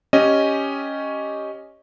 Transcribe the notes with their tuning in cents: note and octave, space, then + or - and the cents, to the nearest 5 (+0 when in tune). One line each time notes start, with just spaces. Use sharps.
C#4 +0 G4 +0 D#5 +0